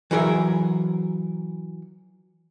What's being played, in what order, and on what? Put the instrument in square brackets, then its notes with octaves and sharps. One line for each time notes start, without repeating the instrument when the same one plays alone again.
[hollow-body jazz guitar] E3 F#3 G#4 A#4 C5 E5